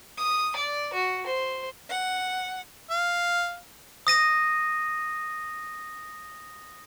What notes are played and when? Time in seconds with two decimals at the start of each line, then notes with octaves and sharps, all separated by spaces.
0.17 D#6
0.56 D5
0.93 F#4
1.26 C5
1.88 F#5
2.91 F5
4.07 D#6 A#6 D#7